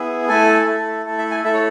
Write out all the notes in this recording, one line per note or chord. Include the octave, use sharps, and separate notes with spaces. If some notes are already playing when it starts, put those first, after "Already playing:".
Already playing: B3 E4 G#4
A3 E4 A4 G#5
A3 E4 A4
A3 E4 A4
E5
G#5
A3 E4 A4 E5
C#5